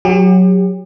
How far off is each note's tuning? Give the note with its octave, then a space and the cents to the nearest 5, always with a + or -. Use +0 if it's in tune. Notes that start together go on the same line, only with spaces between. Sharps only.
F#3 +0 G4 +35